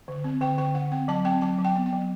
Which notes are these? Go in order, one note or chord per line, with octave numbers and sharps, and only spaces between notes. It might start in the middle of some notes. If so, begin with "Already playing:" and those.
D3
C4
D3 G5
D3 G5
D3 F#5
C4 G5
F#3 A5
C4 G5
F#3 A5
F#3
G5
B3
G5
F#3